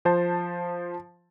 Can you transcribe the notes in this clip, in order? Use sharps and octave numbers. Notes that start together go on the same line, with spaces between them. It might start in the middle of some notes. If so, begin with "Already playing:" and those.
F3 C5 A5